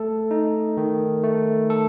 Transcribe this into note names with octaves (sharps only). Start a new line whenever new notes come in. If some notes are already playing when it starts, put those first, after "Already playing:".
Already playing: A3 A4
D#4
D#3
A3
A4